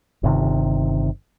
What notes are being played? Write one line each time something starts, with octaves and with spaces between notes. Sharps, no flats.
G1 C3 D#3